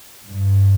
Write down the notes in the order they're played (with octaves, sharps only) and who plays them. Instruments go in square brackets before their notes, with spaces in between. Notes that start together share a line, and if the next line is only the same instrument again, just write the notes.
[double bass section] G2